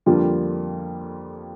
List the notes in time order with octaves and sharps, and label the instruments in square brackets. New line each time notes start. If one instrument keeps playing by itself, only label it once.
[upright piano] F2 D3 G3 A#3 F4